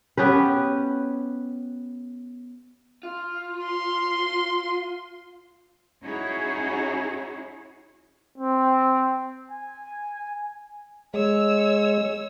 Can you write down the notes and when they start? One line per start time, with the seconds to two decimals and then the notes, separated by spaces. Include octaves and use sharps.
0.17 B3 C#4 G4 B4
3.03 F4
3.65 C6
6.03 C#4 D#4 E4 F#4 G#4 C#5
8.38 C4
9.51 G#5
11.14 G#3 C#5 E6